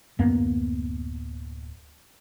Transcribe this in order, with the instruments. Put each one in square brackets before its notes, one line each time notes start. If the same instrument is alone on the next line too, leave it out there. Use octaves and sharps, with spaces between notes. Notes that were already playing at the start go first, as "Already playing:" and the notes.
[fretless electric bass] D1 F#2 A#3 B3